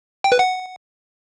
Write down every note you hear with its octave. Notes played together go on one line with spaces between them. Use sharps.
G5
B4
F#5